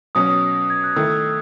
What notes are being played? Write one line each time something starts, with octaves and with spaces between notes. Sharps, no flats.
B2 F#3 C#4 D#6
G#6
F#6
D#3 A3 E4 E6